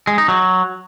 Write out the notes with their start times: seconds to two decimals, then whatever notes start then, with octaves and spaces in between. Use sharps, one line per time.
0.07 G#3
0.18 D#4
0.28 F#3